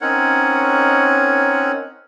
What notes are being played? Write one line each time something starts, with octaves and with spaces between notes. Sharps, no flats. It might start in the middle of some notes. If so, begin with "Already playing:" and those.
C4 C#4 D#4 A#4 C#5 F#5